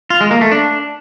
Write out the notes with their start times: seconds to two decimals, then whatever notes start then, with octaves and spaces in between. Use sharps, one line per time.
0.10 F4
0.21 G#3
0.31 A#3
0.41 A3
0.52 D4